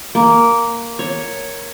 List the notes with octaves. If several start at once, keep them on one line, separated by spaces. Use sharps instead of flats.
A#3
C#5